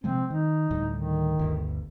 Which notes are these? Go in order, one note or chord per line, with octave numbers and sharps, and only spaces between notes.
C3 F3 G#3 C4
D#3 D#4
D2 A2 G3
D#3
G1 D2